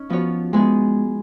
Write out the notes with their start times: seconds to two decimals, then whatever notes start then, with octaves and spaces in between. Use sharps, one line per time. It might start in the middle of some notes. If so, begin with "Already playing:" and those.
Already playing: C#4 D#4
0.10 F3 B3 F#4 C#5
0.53 G#3 B3 D#4 G#4